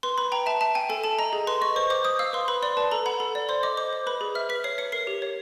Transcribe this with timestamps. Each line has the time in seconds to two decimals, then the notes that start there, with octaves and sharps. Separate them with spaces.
0.03 B4 C6
0.18 B4 B5
0.32 G5 A#5
0.46 E5 A5
0.61 E5 A5
0.75 G5 G#5
0.89 A4 G#5
1.04 A4 A5
1.19 D#5 A#5
1.33 G#4
1.47 B4 C6
1.61 D#5 C#6
1.76 C5 C#6
1.90 C5 D6
2.05 C5 D#6
2.19 F5 E6
2.33 B4 C6
2.48 B4 B5
2.63 D5 C6
2.77 B4 A5
2.91 A4 A#5
3.06 F#5 B5
3.20 A4
3.35 D5
3.49 C5 C6
3.63 D#5 D6
3.77 C5 D6
3.93 C5
4.06 B4 B5
4.21 G#4
4.35 E5 F6
4.49 B4 B6
4.64 C#5 C7
4.78 C#5 C#7
4.92 A#4 C7
5.07 G4
5.22 C#5